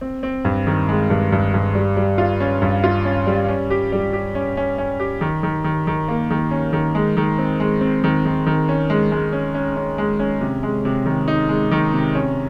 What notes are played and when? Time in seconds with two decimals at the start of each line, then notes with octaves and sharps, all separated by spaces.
0.01 C4
0.23 C4
0.45 G2
0.67 D#3
0.89 G#3
1.10 G2
1.32 G2
1.54 G2
1.75 G3
1.97 G3
2.18 F4
2.40 C#4
2.62 G2
2.84 F4
3.05 C#4
3.27 G3
3.48 C#4
3.70 G4
3.92 G3
4.13 G4
4.35 C#4
4.57 C#4
4.78 C#4
5.00 G4
5.21 D#3
5.43 D#3
5.64 D#3
5.87 D#3
6.08 A#3
6.30 D#3
6.51 C#4
6.73 D#3
6.95 G#3
7.17 D#3
7.39 C4
7.60 G#3
7.81 C4
8.04 D#3
8.25 D#3
8.46 D#3
8.69 C#4
8.90 G#3
9.12 G#3
9.33 C#4
9.55 C#4
9.77 C#4
9.98 G#3
10.20 C#4
10.41 C3
10.63 G#3
10.85 C3
11.06 D#3
11.28 D#4
11.49 G#3
11.71 D#3
11.93 C3
12.15 C#4